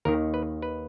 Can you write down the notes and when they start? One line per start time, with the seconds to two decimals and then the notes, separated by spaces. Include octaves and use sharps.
0.05 D#2 D#3 A#4
0.34 B4
0.62 B4